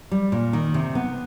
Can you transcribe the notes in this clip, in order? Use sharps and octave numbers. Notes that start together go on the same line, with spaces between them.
G3
A#2
D#3
C3
B3